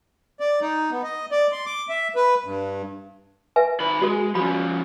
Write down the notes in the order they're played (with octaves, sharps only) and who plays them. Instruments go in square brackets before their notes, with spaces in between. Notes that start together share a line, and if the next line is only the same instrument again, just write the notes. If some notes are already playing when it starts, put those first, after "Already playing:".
[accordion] D5
D#4
B3
D#5
D5
C6
D6
E5
B4
G2
[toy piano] B4 E5 G#5
[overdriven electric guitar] D#3 B5
[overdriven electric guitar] G#3 [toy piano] F#4 A4
[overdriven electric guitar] F3 C#4 [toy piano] F#4 B5